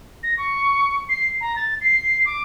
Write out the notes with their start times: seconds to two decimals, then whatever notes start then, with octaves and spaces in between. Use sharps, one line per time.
0.23 A#6
0.37 C#6
1.09 C7
1.41 A#5
1.56 A6
1.81 C7
2.25 D6